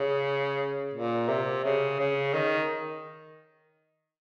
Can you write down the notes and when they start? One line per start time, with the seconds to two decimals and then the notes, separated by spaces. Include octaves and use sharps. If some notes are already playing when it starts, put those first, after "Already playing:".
Already playing: C#3
0.94 A#2
1.29 C3
1.64 C#3
1.99 C#3
2.34 D#3